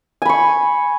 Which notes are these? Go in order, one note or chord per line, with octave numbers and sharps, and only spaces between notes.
G#5 B5 C#6